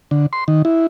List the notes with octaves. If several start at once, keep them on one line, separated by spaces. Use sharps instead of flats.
D3
C6
D#3
E4